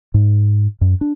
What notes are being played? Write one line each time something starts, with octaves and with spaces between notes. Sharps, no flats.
G#2
F#2
D4